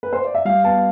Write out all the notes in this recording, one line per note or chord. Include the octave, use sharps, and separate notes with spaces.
B4
C5
D5
E5
G3 F5
B3 A5